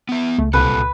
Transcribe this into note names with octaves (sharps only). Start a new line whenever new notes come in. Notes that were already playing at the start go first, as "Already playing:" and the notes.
B3 E5
C#2 A3
C2 A#2 A4 B4